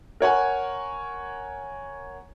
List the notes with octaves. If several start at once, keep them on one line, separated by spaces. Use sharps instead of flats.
A#4 C#5 F#5 G#5